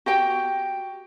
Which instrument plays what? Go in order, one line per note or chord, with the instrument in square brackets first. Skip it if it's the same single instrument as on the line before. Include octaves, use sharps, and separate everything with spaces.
[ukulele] F#4 G4 G5